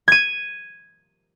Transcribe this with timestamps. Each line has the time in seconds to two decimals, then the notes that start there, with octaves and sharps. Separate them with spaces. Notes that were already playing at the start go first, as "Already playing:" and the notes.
0.08 G#6 D#7